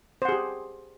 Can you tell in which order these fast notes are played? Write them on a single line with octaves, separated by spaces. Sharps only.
C5 F#5 G#4 G4